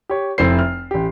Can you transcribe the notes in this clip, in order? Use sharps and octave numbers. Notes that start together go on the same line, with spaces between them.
G4 C#5
F1 C4 E4 C5 C7
F6
A1 G4